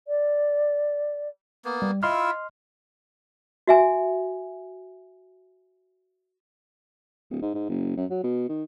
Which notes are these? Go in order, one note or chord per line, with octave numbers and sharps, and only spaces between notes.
D5
A#3 B3
G3
E4 F4 D#5 E5 C6 F6
F#4 E5 G#5
D1
G#2
G#2
F#1
F#2
F#3
B2
D#3